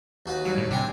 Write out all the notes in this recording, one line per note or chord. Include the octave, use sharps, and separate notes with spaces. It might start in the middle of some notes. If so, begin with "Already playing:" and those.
D#2 F#4 B4
F#3 G3
A2
C3 D4 G5 G#5